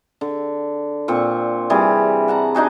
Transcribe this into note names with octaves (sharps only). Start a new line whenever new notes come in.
D3
A#2 C4 C#6
C3 E3 G3 G#4
F#5 A5 A#5
D4 D#4 F#4 G#4